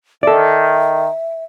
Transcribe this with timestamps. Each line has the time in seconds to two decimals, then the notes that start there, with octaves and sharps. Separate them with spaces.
0.23 D#3 A4 D5 E5